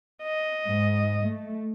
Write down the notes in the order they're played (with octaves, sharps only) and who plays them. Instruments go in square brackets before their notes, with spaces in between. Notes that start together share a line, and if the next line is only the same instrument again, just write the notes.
[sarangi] D#5
[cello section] G#2
A3